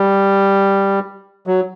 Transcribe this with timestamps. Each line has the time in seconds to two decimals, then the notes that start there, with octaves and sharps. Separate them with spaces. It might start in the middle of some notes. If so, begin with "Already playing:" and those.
Already playing: G3
1.47 F#3